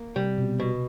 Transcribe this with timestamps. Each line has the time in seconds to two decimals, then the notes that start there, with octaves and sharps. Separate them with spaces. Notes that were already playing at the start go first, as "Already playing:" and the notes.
Already playing: A#3
0.16 C3 G3
0.38 B2
0.60 B2